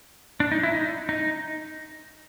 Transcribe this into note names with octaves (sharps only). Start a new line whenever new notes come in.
D4
D#4
E4
D#4
D#4